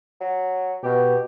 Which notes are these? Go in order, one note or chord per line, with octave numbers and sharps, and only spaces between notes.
F#3
B2 G4